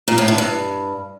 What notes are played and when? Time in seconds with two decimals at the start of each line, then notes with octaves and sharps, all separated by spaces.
0.08 A#2
0.18 A2
0.28 D3
0.38 G2